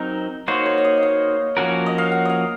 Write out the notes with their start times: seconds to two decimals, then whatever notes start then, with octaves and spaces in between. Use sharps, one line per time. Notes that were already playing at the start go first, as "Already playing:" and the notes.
Already playing: F#3 C4 D#4 A#4
0.48 A#3 D#4 F#4 C5 C#5
0.66 C#5
0.78 F5
0.84 D#5
0.97 D#5
1.03 F5
1.57 F3 A#3 C#4 F#4 A#4
1.86 D#5
1.98 F5
2.12 F#5
2.25 D#5 F5